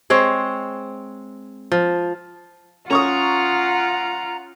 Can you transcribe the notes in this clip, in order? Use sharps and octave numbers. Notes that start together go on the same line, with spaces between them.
G#3 C4 C#5
F3
C#4 F4 F#5 A#5 C#6 D#6